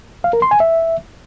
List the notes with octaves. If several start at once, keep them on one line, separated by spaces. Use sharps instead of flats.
F5
A#4
C6
G#5
E5